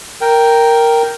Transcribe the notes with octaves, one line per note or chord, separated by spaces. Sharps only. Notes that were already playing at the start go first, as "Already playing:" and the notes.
A#4 G5